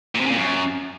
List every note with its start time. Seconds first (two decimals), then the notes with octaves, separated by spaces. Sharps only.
0.15 A#2
0.21 C3
0.26 C#3
0.32 A#2
0.37 F#2